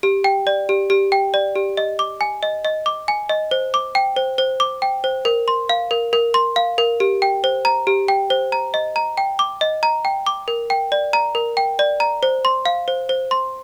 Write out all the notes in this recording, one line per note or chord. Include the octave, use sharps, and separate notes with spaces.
G4
G5
D5
G4
G4
G5
D5
G4
D#5
D6
G#5
D#5
D#5
D6
G#5
D#5
C5
D6
G5
C5
C5
D6
G5
C5
A#4
C6
F5
A#4
A#4
C6
F5
A#4
G4
G5
C5
A#5
G4
G5
C5
A#5
D#5
A#5
G5
D6
D#5
A#5
G5
D6
A#4
G5
D5
A#5
A#4
G5
D5
A#5
C5
C6
F5
C5
C5
C6